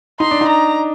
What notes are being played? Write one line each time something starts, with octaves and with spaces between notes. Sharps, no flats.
D#4 C6
D4
D#4
A#5